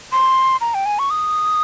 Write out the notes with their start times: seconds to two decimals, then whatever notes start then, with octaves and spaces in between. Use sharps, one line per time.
0.12 C6
0.61 A#5
0.74 G5
0.86 G#5
0.99 C#6
1.10 D#6